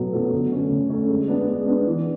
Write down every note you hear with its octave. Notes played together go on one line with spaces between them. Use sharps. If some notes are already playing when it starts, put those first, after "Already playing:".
Already playing: B2 F#3 B3 F#4 A4
F#3 B3 F#4 A4
D3
A3 C#4
D3
A3 C#4
G#3
B3 D4
G#3
B3 D4
E3